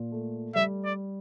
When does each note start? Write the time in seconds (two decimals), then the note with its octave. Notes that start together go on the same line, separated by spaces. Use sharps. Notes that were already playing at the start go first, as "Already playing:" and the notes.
Already playing: A#2
0.12 A3
0.55 G3 E5
0.85 D5